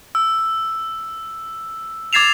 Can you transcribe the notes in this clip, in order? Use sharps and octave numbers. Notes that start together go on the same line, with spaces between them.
E6
D6 G#6 A6 C7 E7 F7